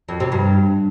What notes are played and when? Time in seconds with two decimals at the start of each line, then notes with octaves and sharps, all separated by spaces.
0.09 F2
0.20 C3
0.32 G2